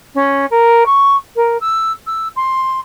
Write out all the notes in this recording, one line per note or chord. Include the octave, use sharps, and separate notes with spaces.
C#4
A#4
C#6
A#4
E6
E6
C6